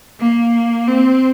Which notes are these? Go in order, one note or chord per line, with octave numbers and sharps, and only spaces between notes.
A#3
C4